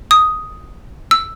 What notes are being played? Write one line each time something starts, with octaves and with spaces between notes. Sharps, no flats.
D#6
E6